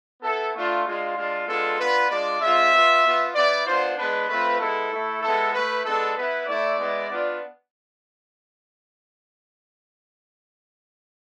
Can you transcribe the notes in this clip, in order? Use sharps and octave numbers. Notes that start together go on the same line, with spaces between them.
B3 E4 A4
A3 D4 F4
G#3 D4 F4
G#3 D4 F4
G#3 B3 D4 F4 A4
B3 D4 F4 B4
G#3 D4 F4 D5
G#3 C4 F4 E5
B3 F4
B3 F4
B3 E4 D5
B3 D4 F4 C5
G#3 B3 D4 B4
A3 C4 F4 B4
G#3 B3 E4 A4
A3 E4
G#3 B3 E4 A4
A3 E4 B4
G#3 B3 D4 A4
B3 E4 B4
A3 E4 D5
G#3 B3 E4
B3 D4 F4